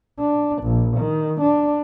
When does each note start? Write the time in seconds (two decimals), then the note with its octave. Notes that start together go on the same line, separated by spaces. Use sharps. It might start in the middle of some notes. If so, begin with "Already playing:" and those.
0.19 D4
0.63 A#1
0.97 D#3
1.41 D4